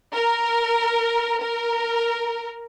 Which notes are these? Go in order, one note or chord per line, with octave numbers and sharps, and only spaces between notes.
A#4
A#4